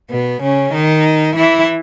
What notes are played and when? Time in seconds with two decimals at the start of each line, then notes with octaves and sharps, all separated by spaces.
0.11 B2 B3
0.42 C#3 C#4
0.73 D#3 D#4
1.37 E3 E4